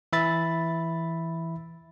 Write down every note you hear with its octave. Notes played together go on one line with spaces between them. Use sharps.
E3 E5 B5 A6